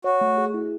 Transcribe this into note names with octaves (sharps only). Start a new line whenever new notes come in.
F#4 C#5
A3
G#4
E4